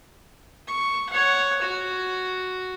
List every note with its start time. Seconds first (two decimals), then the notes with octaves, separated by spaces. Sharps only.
0.67 C#6
1.10 C#5 F#5
1.62 F#4